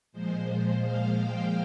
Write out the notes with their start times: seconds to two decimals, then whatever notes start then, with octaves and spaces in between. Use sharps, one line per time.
0.12 A#2 F3 G#3 C5
0.84 F5
1.18 G5